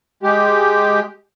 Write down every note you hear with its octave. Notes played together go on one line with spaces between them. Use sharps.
G#3 G4